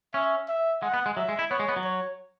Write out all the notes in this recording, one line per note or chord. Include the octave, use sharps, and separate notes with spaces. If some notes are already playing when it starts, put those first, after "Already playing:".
C#4 E5
E5
G#3 F#5
B3
G#3
F#3 E5
G#3
E4
B3 C#5
G#3
B3
F#3
C#5